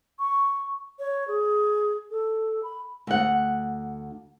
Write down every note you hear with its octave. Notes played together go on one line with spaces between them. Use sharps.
C#6
C#5
G#4
A4
B5
D2 F#5